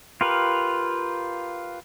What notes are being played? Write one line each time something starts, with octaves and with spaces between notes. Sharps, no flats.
F4 G4 A#4 B4